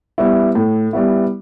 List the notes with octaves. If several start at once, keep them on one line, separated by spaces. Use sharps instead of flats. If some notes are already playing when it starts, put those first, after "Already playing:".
G3 B3 E4
A2
G3 B3 E4